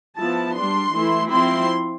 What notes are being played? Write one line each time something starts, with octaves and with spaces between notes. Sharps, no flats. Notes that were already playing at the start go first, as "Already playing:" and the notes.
F3 B3 E4 A5
G3 D4 C6
E3 A3 E4
F3 C4 E4 C6